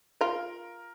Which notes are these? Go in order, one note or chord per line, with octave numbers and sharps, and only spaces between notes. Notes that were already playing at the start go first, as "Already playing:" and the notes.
F4 A#4